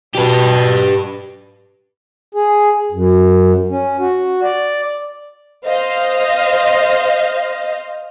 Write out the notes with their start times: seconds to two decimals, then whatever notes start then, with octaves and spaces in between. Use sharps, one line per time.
0.15 B2 G4 B4
2.35 G#4
2.92 F#2
3.69 C#4
3.99 F#4
4.43 D5
5.67 C5 D#5 F5